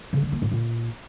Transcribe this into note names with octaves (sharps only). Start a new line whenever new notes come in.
C#3
D3
A#3
A2
A#2